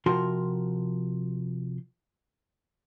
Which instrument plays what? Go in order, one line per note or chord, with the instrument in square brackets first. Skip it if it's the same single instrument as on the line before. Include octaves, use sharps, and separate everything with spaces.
[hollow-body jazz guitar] C3 F3 F#4 A#4 C6